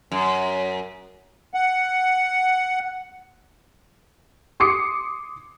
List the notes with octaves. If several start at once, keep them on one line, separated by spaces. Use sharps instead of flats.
F#2
F#5
C6 D6 D#6 C7 C#7